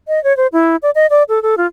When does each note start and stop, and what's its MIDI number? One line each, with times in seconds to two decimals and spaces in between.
0.08 0.22 75
0.24 0.35 73
0.37 0.47 72
0.53 0.76 64
0.83 0.90 74
0.95 1.07 75
1.10 1.23 74
1.29 1.42 69
1.43 1.55 69
1.58 1.67 65